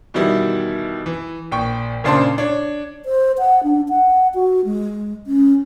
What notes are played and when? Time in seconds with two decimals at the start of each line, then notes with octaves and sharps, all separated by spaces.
0.14 B2 D#3 E3 G3 E4
1.06 E3
1.51 A#1 G5 C#6
2.04 A#2 C#3 D4 C5 A5 C6
2.38 D4 C#5
3.05 C5
3.38 F#5
3.63 D4
3.89 F#5
4.35 F#4
4.65 G#3
5.27 C#4